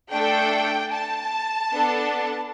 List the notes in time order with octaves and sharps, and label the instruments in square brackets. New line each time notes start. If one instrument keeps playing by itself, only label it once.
[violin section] A3 D4 A4 G5
A5
B3 D4 A4